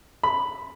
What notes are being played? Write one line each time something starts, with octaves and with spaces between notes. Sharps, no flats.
B5